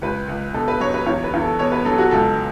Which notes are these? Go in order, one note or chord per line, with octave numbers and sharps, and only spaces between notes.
C#2 B4
C#2
B2 A4
B4
F#3 C#5
B4
E2 C#5
B4
E2
A4
B2 C#5
B4
F#3 A4
F#4
C#2 A4